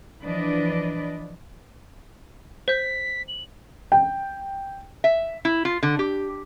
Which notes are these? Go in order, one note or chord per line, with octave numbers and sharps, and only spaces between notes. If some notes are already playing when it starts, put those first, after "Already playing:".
E3 F3 D4 B4 D5 D#5
C5 G6 B6
F#7
G5
E5
E4
F4
D3
G4